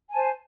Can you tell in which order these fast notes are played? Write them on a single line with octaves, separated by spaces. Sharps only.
G#5 A5 C5